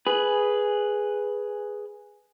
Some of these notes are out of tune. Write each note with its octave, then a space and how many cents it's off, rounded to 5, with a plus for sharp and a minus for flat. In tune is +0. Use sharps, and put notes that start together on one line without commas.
G#4 +0 B4 +0